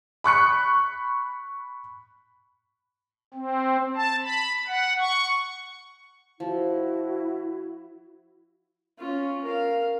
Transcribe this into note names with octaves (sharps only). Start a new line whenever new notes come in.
B5 C#6 F#6 C#7
C4
A5
B5
F#5
C#6
F3 E4 F#4
C#4 F4
A#4 F5